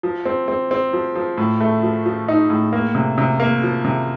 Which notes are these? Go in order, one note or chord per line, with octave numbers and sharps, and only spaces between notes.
F3
C4
C4
C4
F3
F3
A2
A3
F3
F3
D#4
A2
A#3
C3
C3
A#3
F3
C3